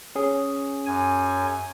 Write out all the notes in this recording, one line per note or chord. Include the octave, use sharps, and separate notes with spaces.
C#4 G#4
F#2 G#5